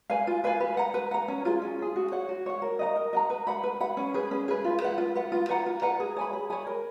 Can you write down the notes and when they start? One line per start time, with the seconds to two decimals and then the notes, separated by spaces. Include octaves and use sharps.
0.10 B4 F5 G#5
0.27 F4
0.44 B4 F5 G#5
0.60 B4
0.77 F#5 A#5
0.94 B4
1.11 F#5 A#5
1.28 C#4
1.45 F4 G#4
1.62 C#4
1.79 F4 G#4
1.96 F#4
2.12 C#5 F#5
2.29 F#4
2.46 C#5 F#5
2.62 A#4
2.79 D#5 F#5 A#5
2.96 A#4
3.13 D#5 F#5 A#5
3.30 B4
3.47 F#5 B5
3.64 B4
3.80 F#5 B5
3.97 C#4
4.14 G#4 B4
4.31 C#4
4.48 G#4 B4
4.64 F4
4.81 B4 F#5
4.98 F4
5.15 B4 F#5
5.32 F4
5.49 B4 F#5 A#5
5.66 F4
5.82 B4 F#5 A#5
6.00 G#4
6.16 C#5 G#5 B5
6.33 G#4
6.50 C#5 G#5 B5
6.67 A#4